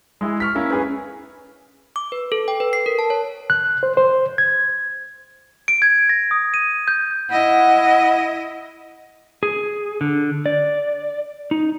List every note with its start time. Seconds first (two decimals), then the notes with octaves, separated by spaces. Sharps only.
0.21 G#3 E4 G#4
0.40 C#6 F6 B6
0.55 A#3 C#4 E4 A#4
0.70 C#4 G#4 B4
1.96 D6
2.12 B4
2.32 A4
2.48 G5
2.60 B4
2.73 C7
2.86 A#4
2.99 A5
3.10 C#5
3.50 F#6
3.83 C5
3.97 C5
4.38 G#6
5.68 D7
5.82 G#6
6.09 A#6
6.31 D#6
6.54 D#7
6.88 G6
7.30 E4 D#5 F#5
9.43 G#4
10.01 D3
10.46 D5
11.51 D#4